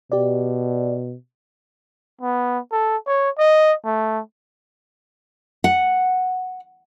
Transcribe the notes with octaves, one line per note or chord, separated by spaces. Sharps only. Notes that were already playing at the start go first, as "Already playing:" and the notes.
B2 G4 D5
B3
A4
C#5
D#5
A3
F#5